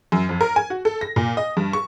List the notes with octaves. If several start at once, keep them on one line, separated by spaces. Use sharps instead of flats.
F#2
F2
A#4
G#5
F#4
A4
A#6
A#2
D#5
G2
C#6